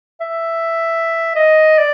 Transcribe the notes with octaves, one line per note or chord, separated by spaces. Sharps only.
E5
D#5
D5